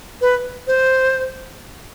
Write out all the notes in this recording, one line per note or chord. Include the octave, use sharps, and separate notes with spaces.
B4
C5